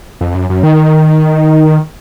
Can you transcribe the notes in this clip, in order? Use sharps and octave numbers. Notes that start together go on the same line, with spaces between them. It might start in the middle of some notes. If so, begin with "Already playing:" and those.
F2
F#2
F#2
D#3